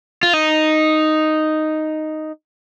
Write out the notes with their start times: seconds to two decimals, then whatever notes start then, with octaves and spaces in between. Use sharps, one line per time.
0.23 F4
0.33 D#4